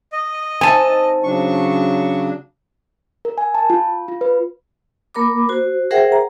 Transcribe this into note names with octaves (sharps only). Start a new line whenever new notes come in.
D#5
C4 D#4 G#5 A5
C#3 F#3 D4 C#6
A#4
G#5
A5
F4
F4
B4
A#3 A#4 B5 D6
F#4 C5
G#4 A#4 C5 E5 F#5 G5
A#5